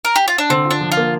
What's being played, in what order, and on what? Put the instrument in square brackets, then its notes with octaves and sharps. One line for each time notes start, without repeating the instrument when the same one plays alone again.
[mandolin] A#4
G4
F4
D4
[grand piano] D3 [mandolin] C4
[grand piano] F4
[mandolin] D4
[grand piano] F3
[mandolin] F4
[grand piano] A#3